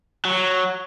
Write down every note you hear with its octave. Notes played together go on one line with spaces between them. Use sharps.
F#3